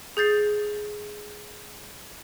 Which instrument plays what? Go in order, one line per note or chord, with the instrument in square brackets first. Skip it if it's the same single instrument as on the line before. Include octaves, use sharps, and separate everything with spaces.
[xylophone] G#4 G6 A6 C7